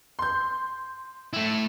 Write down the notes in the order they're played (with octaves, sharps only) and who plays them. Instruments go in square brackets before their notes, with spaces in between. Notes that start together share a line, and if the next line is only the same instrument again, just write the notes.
[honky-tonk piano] C6 G6
[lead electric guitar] A3 E4